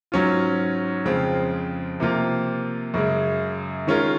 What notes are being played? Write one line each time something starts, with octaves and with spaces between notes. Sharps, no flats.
G#2 F#3 C#4 F4
F2 C#3 G#3 C4 F4
C3 F3 A#3 F4
F#2 C#3 G#3
D#3 G#3 C#4 F4 A#4